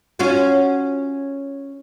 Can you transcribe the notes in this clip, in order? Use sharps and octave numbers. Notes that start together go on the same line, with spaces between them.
C#4 F4 F#4